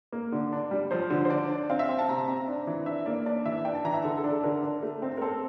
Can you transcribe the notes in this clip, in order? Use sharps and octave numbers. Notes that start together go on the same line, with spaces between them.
A#3
D3
D4
G3
F3 C5
D3
C5
D4 D5
D4
C4 F5
E5
C4 F5
A5
C3 A#5
C4 A#5
D4
E3
D4 E5
A#3 D5
D4 D5
E3 E5
D4 G5
A5
E3 A#5
E5
D3 A4
A4
D4
A4
D3 A#4
D4
A3
C4
A#4
C4 A4